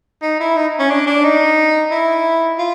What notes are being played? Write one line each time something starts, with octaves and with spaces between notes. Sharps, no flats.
D#4
E4
D#4
C#4
D4
D4
D#4
E4
F4